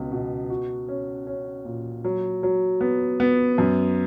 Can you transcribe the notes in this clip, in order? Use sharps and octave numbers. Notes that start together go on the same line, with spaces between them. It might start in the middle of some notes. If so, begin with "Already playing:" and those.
Already playing: C#2 B2 B3
B2
F#4
C#4
C#4
A#2
F#3
F#3
B3
B3
F#2